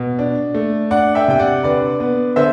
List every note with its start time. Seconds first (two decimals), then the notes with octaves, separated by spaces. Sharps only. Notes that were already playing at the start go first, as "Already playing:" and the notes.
Already playing: B2
0.19 D4
0.55 A3
0.91 D4 D5 F#5
1.15 E5 G5
1.28 C3 G5
1.39 D5 F#5
1.63 D3 B4 D5
2.00 B3
2.36 D3 C5 E5